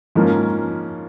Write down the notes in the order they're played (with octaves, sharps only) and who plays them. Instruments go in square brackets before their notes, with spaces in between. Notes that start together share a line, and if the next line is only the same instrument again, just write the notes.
[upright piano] G#2 F3 A#3 C#4